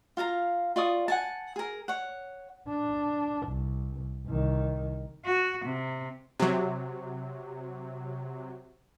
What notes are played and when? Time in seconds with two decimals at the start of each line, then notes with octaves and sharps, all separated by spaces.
0.17 F4 F5 A5 A#5
0.76 F4 D5 C#6 D#6
1.08 F#5 G#5 A5
1.56 G#4 A#4
1.88 C#5 F#5
2.68 D4
3.47 C2
4.26 C2 D#3
5.25 F#4
5.65 C3
6.40 C3 F#3